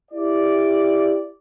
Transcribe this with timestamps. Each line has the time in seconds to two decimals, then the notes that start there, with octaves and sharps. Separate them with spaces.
0.11 E4 G4 D5